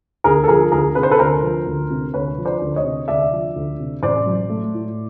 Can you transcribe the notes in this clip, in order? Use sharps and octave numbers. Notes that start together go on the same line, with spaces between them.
D2 G#4 A#4
A4
F3 G#4 A#4
D2 G#4 A#4
C3 B4
C5
A4 B4
D2 A#4 C5
F3
D2
C3
D2 B4 C#5
F3
C5 D5
D2
C#5 D#5
C3
D2 D5 E5
F3
D2
C3
A1 C5 D5
F#3
A3
A2